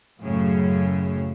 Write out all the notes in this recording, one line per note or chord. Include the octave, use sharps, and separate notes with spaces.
F#2 A2 C#3